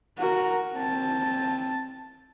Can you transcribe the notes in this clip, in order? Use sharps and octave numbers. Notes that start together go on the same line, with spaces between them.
F#4 A#4
C4 A5